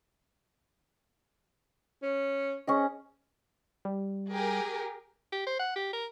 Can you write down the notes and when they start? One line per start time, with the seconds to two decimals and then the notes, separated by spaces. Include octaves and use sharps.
2.03 C#4
2.67 C#4 G#4 D#5
3.85 G3
4.33 G4 G#4 A#4
5.32 G4
5.47 C5
5.59 F#5
5.76 G4
5.93 A#4